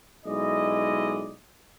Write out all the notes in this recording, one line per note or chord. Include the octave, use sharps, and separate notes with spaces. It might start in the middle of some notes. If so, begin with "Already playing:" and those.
B1 G#3 E4 D5 D#5